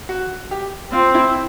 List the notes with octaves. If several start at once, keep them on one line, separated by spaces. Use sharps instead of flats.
F#4
G4
C4 F4
E4